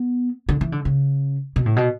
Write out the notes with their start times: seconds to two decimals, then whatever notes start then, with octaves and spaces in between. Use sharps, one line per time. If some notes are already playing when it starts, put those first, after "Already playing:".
Already playing: B3
0.49 D3
0.61 E3
0.72 D3
0.85 C#3
1.56 B2
1.66 A2
1.76 B2